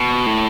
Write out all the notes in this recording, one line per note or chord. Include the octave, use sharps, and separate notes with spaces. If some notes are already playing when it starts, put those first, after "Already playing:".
Already playing: B2
A2